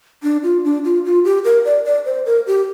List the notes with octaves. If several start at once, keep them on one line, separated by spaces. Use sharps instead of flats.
D4
F4
D4
F4
F4
G4
A#4
D5
D5
C5
A#4
G4